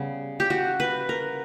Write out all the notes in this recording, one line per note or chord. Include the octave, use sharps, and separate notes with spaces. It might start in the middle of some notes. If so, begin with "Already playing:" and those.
Already playing: C#3 G3 B3
G4
F#4
B4
A#4